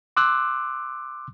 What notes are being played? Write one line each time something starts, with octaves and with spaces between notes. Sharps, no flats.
C6 D6 E6 F#6